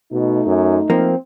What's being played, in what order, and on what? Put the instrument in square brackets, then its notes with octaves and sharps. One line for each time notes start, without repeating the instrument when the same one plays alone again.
[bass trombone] B2 [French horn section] A3 D#4
[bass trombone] F#2
[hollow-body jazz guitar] F3 A#3 [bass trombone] C4